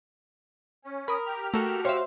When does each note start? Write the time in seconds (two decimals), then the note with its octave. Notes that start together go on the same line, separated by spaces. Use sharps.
0.85 C#4
1.08 A#4 B5 D#6
1.26 G4 F6
1.54 A3 A#3 F#4 A4
1.85 C5 C#5 E5 F5